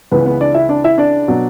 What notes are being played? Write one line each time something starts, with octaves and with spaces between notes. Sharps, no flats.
C#2 C#3 E3 B3 B4
B3 B4
D4 D5
E4 E5
D4 D5
E4 E5
D4 D5
B2 F#3